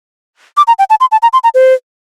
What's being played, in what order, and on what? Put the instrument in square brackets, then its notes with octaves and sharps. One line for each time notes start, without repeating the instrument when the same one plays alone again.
[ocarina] D6
A#5
G5
A5
C6
A5
A#5
C6
A#5
C5